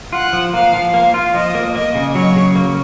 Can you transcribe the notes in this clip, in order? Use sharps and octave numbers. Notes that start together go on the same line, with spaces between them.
F4 F#5
F3
A#3 F5
F3
A#3 F5
F4
F3 D#5
A#3
A#3 D#5
C#3
F#3 C#5
C#3
A#3